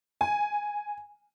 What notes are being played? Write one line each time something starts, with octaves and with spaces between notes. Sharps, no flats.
G#5